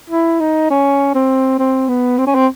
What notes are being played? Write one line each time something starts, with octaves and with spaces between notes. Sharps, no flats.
E4
D#4
C#4
C4
C4
B3
C4
C#4
C4